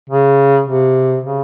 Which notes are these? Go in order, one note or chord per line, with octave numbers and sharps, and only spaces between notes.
C#3
C3
C#3